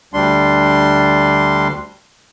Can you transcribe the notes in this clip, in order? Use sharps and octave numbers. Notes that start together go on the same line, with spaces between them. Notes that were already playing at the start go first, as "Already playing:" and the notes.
D2 G3 D4 C6